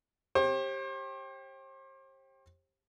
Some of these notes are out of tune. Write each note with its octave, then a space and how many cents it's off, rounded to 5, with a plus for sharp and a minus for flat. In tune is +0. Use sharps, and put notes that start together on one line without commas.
G4 +0 C5 +40